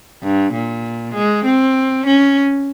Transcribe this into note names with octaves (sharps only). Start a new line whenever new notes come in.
G2
A#2
G#3
C4
C#4